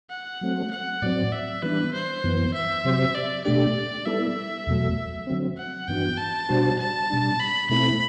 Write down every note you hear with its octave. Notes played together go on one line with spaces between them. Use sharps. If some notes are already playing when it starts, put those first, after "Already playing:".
F#5
F#3 A3 C4
F#5
A2 F#3 C4 D5
E5
E3 G3 B3 D4 B4
C5
F#2 E3 B3
E5
C3 F#3 C4 G4 C5
D5
B2 A3 D4 G4 D5
G3 B3 E4 A4 E5
E2 B2 F#3 A3
D3 F#3 C4
F#5
G2 E3 B3 D4 F#4 G5
A5
B2 G3 D4 F#4 C5
A5
B2 G3 D4
B5
B2 A3 C4 E4 B5